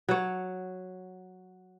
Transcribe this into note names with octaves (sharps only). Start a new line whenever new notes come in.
F#3 C#5